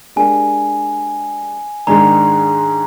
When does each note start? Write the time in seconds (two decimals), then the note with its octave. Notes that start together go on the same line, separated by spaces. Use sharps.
0.16 G#3 D4 G4 A#4 G#5
1.87 G#2 D#3 G#3 D4 G#4 A#5